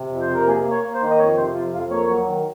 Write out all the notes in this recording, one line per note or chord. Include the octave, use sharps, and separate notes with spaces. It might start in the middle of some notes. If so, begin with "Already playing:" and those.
Already playing: C3
F2
C5
C3 A#4
A#3 G#4
A#3
C#5
A#3
C5
D#3
D#5
F2 C#5
C3 C5
F2 F4
F2 F4
A#3 C#5
F#3
D#3